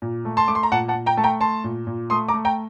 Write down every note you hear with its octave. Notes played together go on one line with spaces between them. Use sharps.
A#2
A3
A5 C6
A3 D6
C6
A#5
A#2 F#5 A5
F#5 A5
A#2
G5 A#5
A3 A5
G5 A#5
A3 A5 C6
A#2
A#2
A3 C6 D#6
A#5 D6
A3
G5 A#5